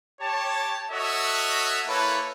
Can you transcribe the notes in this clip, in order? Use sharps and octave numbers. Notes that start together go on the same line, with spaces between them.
G4 C#5 A5
F#4 A4 C#5 D#5 E5 F#5
A#3 E4 A4 B4 C#5